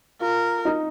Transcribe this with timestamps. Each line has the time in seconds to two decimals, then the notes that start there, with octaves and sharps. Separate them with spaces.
0.20 F4 A#4
0.65 D#4